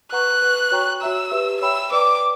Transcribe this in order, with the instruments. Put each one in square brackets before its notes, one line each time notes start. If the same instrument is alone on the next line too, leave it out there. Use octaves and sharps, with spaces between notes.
[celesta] B4 F#5 A#5 C#6 [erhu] F#6
[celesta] B4 F#5 C#6
F#4 C#5 G5 A#5 C#6
[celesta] F#4 C#5 E5 A#5 [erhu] E6
[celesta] G4 B4 E5
[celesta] C#5 G5 B5 [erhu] E6
[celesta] B4 D5 G5 A#5 [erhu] D6